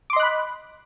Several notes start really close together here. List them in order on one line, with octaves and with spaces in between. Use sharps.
D6 C6 D#5 F#6 B5